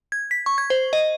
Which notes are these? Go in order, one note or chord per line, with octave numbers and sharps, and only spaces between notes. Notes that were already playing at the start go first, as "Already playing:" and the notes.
G#6
B6
C#6
G#6
C5
D#5